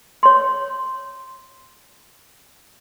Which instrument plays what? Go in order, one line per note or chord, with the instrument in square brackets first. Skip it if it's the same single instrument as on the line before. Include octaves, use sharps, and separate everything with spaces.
[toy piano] C#5 C6